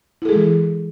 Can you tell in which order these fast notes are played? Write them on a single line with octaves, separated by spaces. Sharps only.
E4 A4 G#4 G#3 E3